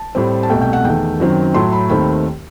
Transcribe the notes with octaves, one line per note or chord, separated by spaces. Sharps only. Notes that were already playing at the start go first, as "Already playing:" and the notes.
Already playing: A5
A2 G3 C4
A5
C2 B2 A3 G5
G5
F#5
E2 D#3 A3 G5
F#2 D#3 F#3 C4
A2 F#3 A3 C6
B5
D#2 D#3 A3 C4 B5